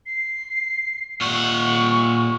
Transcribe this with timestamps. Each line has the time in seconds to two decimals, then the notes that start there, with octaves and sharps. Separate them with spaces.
0.06 C7
1.21 A#2 F#5 C#6